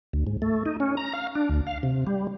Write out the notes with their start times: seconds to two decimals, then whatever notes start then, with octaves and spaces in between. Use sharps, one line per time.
0.13 D2
0.27 G#2
0.42 A3
0.66 D#4
0.80 C#4
0.97 A#5
1.13 F5
1.35 D4
1.49 D2
1.67 F5
1.83 C3
2.07 G3